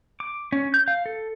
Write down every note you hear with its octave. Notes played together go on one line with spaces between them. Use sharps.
D6
C#4
G6
F5
A4